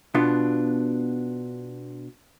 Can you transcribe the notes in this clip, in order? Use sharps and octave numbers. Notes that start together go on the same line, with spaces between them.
B2 B3 D4 F4